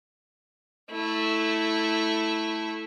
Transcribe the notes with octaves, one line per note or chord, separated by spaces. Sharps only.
A3 E4